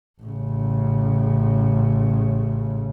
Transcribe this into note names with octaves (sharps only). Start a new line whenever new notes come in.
A1 C#3